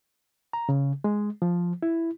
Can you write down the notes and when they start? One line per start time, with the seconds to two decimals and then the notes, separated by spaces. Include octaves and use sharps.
0.53 A#5
0.69 C#3
1.04 G#3
1.42 F3
1.83 E4